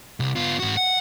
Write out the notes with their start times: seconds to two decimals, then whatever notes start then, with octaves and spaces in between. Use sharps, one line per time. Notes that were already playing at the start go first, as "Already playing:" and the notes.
0.20 C2
0.36 B3 F4
0.59 G#2 F#4
0.77 F#5